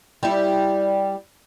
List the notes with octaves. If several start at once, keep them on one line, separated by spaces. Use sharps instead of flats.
G3 E4